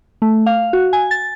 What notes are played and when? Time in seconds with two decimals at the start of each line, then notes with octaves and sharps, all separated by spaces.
0.22 A3
0.46 F5
0.73 F#4
0.93 G#5
1.11 A6